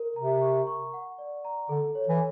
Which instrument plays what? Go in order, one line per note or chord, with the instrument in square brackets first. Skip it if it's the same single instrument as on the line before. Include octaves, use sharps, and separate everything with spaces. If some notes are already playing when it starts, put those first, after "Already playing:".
Already playing: [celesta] A#4
[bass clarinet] C3 [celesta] A#5
[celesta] C#6
C#6
F#5
D5
A#5
[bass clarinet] D3 [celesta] A4
[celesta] C#5
[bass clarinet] E3